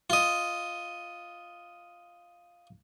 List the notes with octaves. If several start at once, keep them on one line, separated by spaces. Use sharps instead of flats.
F4 D#5